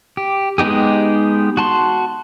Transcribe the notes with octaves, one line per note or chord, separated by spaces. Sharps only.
G4
G#3 B3 D#4 G4 G#4
F#4 A5 C6